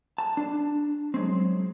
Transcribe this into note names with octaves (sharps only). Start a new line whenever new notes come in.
A5
D4
F#3 G#3 C4